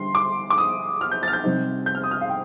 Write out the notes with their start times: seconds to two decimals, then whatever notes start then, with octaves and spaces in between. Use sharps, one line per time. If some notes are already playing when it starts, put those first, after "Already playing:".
Already playing: D3 G3 D4 C6
0.15 D6
0.50 D6
0.58 D#6
1.01 F6
1.11 G6
1.23 A6
1.28 F6
1.33 G6
1.44 C3 G3 C4 D#4
1.86 G6
1.95 F6
2.04 D#6
2.11 F6
2.21 F5
2.29 G5